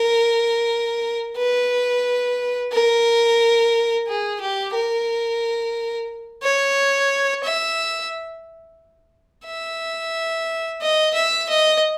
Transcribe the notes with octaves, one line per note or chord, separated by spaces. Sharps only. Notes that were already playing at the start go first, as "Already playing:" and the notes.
Already playing: A#4
B4
A#4
G#4
G4
A#4
C#5
E5
E5
D#5
E5
D#5